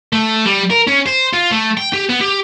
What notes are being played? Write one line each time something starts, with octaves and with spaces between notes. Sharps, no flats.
A3
G3
A#4
C#4
C5
F4
A3
G5
G4
B3
G4